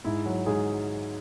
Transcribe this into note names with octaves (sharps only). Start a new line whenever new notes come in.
G#2 E4
F#3
G#2 G#4